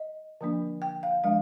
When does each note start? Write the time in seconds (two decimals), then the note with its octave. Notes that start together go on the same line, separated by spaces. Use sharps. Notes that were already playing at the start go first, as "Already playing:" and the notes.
Already playing: D#5
0.41 D3 F3 A#3 D4
0.82 G5
1.03 F5
1.24 D3 F3 G#3 D4 F5